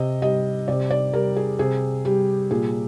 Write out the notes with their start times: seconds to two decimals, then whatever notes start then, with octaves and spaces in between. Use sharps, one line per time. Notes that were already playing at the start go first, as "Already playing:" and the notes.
Already playing: C3 D#5
0.22 G3 D#5
0.68 C3 D5
0.91 D5
1.13 G3 A#4
1.36 G#4
1.59 C3 G#4
2.05 G3 G4
2.51 A#2 G#4